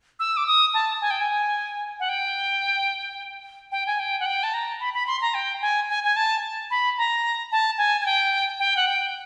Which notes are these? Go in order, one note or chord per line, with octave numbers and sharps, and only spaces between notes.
E6
D6
D#6
A5
G#5
G5
G#5
F#5
G5
G5
G#5
G5
F#5
G5
A5
A#5
B5
B5
C6
A#5
G5
G#5
G#5
G#5
A5
B5
A#5
A5
G#5
G#5
G5
G5
F#5
G5